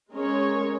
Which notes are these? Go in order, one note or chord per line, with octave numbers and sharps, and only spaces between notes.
G#3 C#4 A#4 C#5